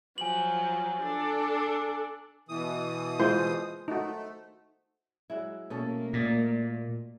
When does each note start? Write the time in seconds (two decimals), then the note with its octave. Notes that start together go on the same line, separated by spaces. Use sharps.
0.18 F3 F#3 G#5 F#7
1.02 D4 A4
2.49 B2 E3 D#6
3.19 G#3 E4 F4 C5
3.88 A3 D#4 F#4
5.30 F#3 G#3 E4
5.70 B2 A3 A#3 C#4 A4
6.13 A#2 A#4 D5 D#5